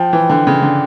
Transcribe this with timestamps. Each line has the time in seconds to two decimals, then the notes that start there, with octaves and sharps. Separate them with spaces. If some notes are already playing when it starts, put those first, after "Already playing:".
Already playing: F3 G5
0.13 E3
0.30 D3
0.47 C#3
0.62 D3